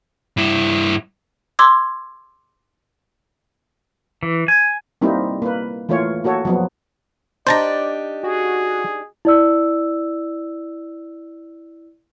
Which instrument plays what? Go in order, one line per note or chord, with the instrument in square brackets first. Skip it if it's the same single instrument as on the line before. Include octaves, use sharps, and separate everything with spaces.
[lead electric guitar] G2 E4
[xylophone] C6 D6 E6 G#6
[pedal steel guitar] E3
G#5
[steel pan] G3 A#3 C4 D#4 E4
A#3 B4
E3 A3 A#3 F4 C#5
A#3 F#4 A4 C#5
F3 F#3 B3
[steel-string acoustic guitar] D4 D#4 G4 [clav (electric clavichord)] C5 A5 A#5 [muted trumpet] D5
[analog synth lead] F#4 [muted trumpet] G#4
[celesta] E4 D5 E6